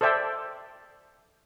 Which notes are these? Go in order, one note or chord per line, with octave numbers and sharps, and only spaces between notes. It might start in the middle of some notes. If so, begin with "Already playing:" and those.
A4 C5 D5 E5 G5